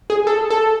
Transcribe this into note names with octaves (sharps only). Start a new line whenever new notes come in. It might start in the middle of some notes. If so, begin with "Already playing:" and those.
G#4
A4
A4